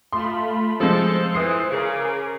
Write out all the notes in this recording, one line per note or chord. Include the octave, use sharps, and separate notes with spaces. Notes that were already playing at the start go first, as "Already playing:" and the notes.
A3 F4 B5 C6
F3 G#3 A4 C5
E3 D#6 C7
C#3 G#4 A#4 D6